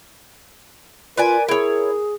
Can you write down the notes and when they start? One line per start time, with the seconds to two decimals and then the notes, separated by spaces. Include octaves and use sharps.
1.18 F4 A#4 B4 D5 G#5
1.48 E4 G#4 C#5